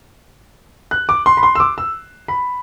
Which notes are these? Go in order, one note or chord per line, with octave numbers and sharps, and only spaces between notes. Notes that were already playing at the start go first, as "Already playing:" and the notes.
F#6
D6
C6
B5
C6
E6
D6
E6
B5